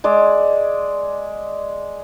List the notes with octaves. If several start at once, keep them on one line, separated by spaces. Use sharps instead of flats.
G#3 D5